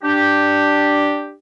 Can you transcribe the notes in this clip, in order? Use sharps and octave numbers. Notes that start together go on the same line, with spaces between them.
D4 G4